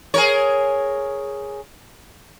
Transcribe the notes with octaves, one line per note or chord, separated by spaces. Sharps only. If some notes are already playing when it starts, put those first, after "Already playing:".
G#4 A#4 C#5